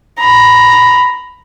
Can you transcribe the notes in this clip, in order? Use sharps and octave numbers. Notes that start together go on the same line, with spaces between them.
A#5 B5